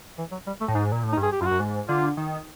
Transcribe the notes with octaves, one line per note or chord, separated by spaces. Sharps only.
E3
F#3
G3
A3
A2
G#2 D#4
A#2
A2
D#4
G2
G#4
G4
F#2 F4
F#4
F#2
G#2
D3 F4
D#3